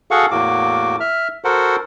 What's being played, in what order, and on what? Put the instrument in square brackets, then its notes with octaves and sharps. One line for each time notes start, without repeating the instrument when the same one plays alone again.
[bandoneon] F#4 G#4 A4 F5 F#5 C#6
E2 A2 A#3 F#4 D6
E5 F6
F#4 A4 A#4 C5 F#5